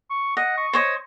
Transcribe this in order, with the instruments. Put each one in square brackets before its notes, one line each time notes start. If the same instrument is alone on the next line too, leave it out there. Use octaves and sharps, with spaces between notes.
[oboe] C#6
[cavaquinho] D#5 [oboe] F#5
[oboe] C#6
[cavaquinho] C5 C#5 D#5